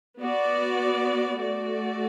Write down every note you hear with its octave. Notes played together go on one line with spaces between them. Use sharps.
B3 F#4 D5
A3 F#4 D5